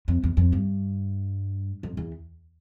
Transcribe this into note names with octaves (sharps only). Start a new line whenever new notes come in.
F2
E2
F2
G2
F2
E2